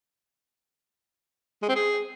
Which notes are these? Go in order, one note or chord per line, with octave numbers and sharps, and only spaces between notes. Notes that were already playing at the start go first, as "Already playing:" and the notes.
G#3
C4
G#4